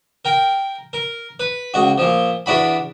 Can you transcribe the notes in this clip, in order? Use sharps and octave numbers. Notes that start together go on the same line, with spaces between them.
A#4 G5
A#4
B4
C#2 F#4
A#2 F3
E2 D4 F#4 B5